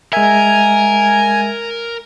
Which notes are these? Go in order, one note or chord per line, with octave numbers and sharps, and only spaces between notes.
G#3 A#4 E5 G#5